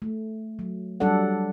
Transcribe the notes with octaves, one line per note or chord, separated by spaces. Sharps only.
A3
F#3
F#3 G3 D4 A4 D5 F#5